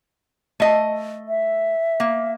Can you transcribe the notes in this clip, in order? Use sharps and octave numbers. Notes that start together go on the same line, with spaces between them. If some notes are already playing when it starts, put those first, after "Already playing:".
A3 D#5
E5
A#3